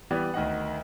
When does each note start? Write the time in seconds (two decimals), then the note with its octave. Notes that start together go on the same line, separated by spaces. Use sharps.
0.11 E3 G3 B3 D5
0.34 D2 D#3 D#5 F#5